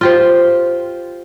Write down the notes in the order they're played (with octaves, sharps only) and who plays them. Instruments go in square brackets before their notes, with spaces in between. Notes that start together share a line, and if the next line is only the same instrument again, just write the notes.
[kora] F4 G4 C5